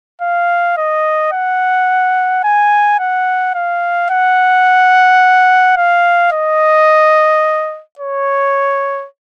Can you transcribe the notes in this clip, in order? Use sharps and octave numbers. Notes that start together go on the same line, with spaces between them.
F5
D#5
F#5
G#5
F#5
F5
F#5
F5
D#5
C#5